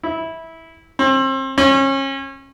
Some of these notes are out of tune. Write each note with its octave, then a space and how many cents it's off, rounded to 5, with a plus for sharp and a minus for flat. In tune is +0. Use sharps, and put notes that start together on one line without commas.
E4 -15
C4 +35
C#4 -35